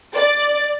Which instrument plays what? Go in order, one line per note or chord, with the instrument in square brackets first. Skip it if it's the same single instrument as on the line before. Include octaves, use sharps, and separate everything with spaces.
[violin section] D5